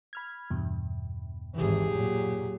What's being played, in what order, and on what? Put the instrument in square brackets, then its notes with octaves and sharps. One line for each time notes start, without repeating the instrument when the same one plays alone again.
[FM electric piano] B5 F6 G#6
E2 G2 B2
[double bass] G#1 E3 [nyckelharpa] G4 G#4
[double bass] A#2 F#3